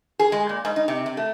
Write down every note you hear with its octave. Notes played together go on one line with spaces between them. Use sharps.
G#4
G#3
A#2
G#2
D#4
C3
C3
A3